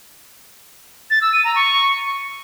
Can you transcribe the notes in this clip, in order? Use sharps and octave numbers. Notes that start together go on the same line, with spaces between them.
A6
E6
D#7
A#5
C#6